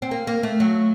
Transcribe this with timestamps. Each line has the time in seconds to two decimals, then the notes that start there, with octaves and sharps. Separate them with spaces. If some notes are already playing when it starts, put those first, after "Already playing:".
0.02 C4
0.11 A#3
0.27 A#3
0.43 A3
0.60 F#3